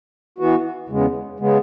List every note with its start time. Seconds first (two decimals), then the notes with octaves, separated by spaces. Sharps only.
0.38 E3 B3 F#4
0.89 E2 C#3 G#3 B3
1.40 C#3 G#3 B3